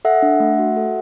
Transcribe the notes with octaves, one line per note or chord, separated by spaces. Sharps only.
A4 E5 F#5
D4
A3
F#4
A4